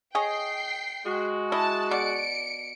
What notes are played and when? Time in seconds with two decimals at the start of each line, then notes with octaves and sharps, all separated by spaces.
0.15 G#4 C#5 D#5 G5 C7
1.06 G#3 F#4
1.52 E4 D#5 A5
1.91 B2 D5 C#7 D7